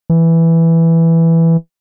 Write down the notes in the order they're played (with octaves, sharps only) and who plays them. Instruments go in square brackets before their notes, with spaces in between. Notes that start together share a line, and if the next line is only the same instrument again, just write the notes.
[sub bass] E3